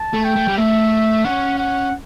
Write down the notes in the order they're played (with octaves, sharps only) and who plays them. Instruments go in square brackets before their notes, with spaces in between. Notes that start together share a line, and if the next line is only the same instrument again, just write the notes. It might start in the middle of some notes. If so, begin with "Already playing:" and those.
Already playing: [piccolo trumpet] A5
[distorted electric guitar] A3
[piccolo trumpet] G5
[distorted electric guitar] A3
G3
[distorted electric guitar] A3 [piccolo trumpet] E5
[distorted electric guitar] C#4 [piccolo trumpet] F#5
[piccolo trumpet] F#5